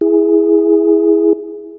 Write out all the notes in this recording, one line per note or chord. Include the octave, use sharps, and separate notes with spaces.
E4 G#4